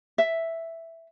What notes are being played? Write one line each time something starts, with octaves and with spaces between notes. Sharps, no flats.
E5